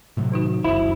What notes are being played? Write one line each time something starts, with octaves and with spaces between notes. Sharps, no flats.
A2 C3 F#3
D#3 D#4 F#4
F1 C#2 F#2 E4 F#4 C5
F#4